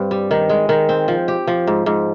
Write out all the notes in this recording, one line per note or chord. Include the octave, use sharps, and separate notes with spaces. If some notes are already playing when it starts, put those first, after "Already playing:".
Already playing: G2 C4
G3
D#3
G#3
D#3
C4
F3
G4
F3
G#2
G#2